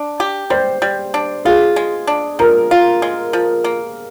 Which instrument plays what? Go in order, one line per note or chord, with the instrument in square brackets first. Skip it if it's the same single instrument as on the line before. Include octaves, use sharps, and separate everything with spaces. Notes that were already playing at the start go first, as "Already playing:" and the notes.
Already playing: [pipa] D4
G4
[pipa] G3 [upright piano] C5
[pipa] G3
D4
[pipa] F4 [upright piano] G#4
[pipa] G#3
D4
[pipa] F3 [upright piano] A#4
[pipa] F4
G#3
F3
A#3